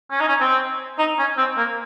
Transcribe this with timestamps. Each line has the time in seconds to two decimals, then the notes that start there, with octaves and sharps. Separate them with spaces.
0.11 C#4
0.20 D#4
0.28 C#4
0.40 C4
0.98 D#4
1.18 C#4
1.38 C4
1.57 A#3